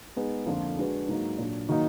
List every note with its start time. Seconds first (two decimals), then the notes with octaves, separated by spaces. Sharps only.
0.16 G#3 B3 D#4
0.46 F2 D3 F3 A#3 F4
0.77 G#3 D4 F#4 B4
1.08 G#2 F#3 A#3 D#4
1.38 A#2 F#3 D4
1.69 D#3 F#3 A#3 D#4